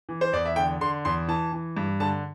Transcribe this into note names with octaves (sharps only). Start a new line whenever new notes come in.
E3
C5
E2 D5
E5
D3 G5
D3 C6
E2 C6
E3 A5
E3
G2
D3 A5